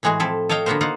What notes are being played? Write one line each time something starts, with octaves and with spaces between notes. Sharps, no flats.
A2 E3 G#3 F#4 G#4
F3 C4 E4 A4
A4 C#5 D#5 F5 G5
D3 A#3 B3 F#4 A#4 C5
A#3 D#4 F4 F#5